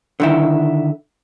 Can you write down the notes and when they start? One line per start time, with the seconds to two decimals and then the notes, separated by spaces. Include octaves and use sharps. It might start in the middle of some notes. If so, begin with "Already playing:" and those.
0.20 D3 D#3 E4